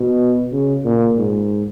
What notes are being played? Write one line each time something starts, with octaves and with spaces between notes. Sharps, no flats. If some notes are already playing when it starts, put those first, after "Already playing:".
Already playing: B2
C#3
A#2
G#2